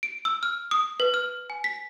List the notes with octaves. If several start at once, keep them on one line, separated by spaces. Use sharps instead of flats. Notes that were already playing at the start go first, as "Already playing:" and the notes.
D7
E6
F6
D#6
B4
F6
G#5
B6